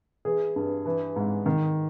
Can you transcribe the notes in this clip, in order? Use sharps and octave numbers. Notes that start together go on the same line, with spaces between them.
E3 G#4
G2
E3
G#2
D#3